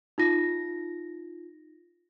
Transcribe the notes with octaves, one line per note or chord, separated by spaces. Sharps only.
D#4 F4 A#6